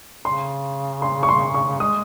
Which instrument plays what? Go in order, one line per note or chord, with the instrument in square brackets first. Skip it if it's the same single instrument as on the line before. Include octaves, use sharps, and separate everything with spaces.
[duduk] C#3 [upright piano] C6
[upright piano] C6
C#6
C6
C#6
[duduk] G#3 [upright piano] D#6